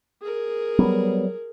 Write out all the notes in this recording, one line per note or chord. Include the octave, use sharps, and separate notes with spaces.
G#4 A#4
F#3 G3 B3